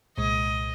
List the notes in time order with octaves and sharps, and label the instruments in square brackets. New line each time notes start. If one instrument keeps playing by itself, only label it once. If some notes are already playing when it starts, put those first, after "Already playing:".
[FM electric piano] C2 A#2 G#3 [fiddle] D#5